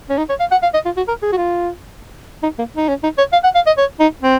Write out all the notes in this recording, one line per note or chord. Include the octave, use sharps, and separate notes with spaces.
C#4
D#4
C#5
F5
F#5
F5
D#5
F4
F#4
A#4
G#4
F#4
F4
D#4
A#3
D#4
C#4
D#4
C#5
F5
F#5
F5
D#5
C#5
D#4
C4